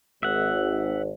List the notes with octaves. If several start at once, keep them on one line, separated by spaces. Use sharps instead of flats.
G#1 E5 F#5